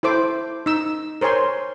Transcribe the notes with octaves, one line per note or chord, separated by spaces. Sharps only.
E4 A4 C5 D6
D#4 E6
A#4 C5 C#5 G#5 C6